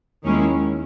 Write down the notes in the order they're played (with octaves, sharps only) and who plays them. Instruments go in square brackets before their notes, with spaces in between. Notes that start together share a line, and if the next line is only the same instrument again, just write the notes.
[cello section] D#2 D#3 G#3 C#4 E4